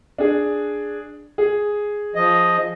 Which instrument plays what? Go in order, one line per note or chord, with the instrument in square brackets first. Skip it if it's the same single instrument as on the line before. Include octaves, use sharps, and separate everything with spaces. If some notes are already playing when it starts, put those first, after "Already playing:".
[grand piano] D4 G#4
G#4
[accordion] F3 D#5